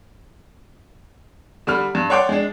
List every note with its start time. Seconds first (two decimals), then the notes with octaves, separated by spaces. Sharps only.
1.67 D3 G3 B5 F6
1.95 G2
2.10 C#5 D5 F#5 G5 C6 D6
2.29 G#3 D4